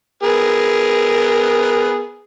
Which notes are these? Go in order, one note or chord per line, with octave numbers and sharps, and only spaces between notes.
B3 G#4 A#4